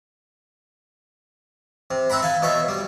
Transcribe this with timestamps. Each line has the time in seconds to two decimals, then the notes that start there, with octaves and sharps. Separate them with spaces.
1.91 C3
2.10 C4 E5 F#5 A#5 B5
2.22 A4 F5 G#5
2.42 B2 A4 C#5 E5
2.68 G3